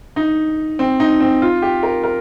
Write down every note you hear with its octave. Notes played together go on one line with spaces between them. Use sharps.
D#4
C4
D#4
C4
F4
G4
A#4
A#4